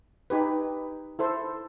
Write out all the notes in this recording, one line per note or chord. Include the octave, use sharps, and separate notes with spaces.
D#4 G4 B4
E4 A4 C5